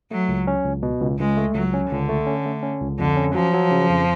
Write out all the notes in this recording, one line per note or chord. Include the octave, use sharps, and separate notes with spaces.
F#3 A3
C#2
C#4
C#2
B2
C#2
C#2 G#3
A3
C#2 F#3
C#4
C#2 D3
A3
C#4
A3
C#4
C#2
F2 D3
C#4
F3 F#3
F#3
C#3
F2